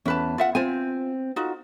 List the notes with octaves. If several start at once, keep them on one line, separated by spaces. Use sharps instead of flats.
E2 C#4 B4 A5
F4 E5 F#5
C4 F4 C5 G#5
D#4 F4 F#4